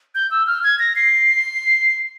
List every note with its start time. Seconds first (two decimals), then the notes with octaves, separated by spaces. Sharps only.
0.15 G6
0.31 E6
0.47 F6
0.64 G#6
0.79 A#6
0.96 C7